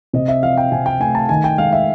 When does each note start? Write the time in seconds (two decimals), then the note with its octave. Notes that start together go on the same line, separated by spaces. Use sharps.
0.13 C3 D#5
0.28 E5
0.43 F3 F5
0.58 G5
0.72 C3 G#5
0.86 G5
1.00 A3 G#5
1.15 A5
1.29 D#3 G#5
1.44 G5
1.58 G#3 F5
1.73 E5